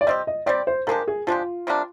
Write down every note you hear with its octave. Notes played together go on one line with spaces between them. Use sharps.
D5
G3 C4 G4 D#5
D#5
G3 C4 G4 D5
C5
F3 G#3 D4 G4 A#4
G#4
F3 G#3 D4 F4 G4
C3 G3 A#3 D4